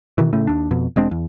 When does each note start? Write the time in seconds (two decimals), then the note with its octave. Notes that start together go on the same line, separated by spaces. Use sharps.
0.18 B2 D#3 E3
0.33 A2 C#3 A3
0.47 D#2 D4
0.71 F2 B2
0.96 E1 G#3 C4 D4
1.11 E2